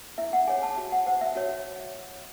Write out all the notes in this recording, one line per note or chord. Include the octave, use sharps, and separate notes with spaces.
E4 E5
F#5
G#4 C#5 G#5
A5
F#4
F#5
C5 F#5
E5
F#4 C#5